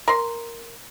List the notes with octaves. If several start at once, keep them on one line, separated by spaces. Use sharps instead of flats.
A#4 C6